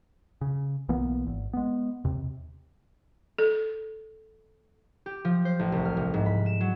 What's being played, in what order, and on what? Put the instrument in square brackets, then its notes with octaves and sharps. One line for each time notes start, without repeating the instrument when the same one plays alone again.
[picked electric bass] C#3
B1 E3 A#3 B3
G#1
G#3 B3
D#2 C3
[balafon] A4
[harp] G4
F3
C5
A1
C2
F6
C3
G#2
B5
E7
F#3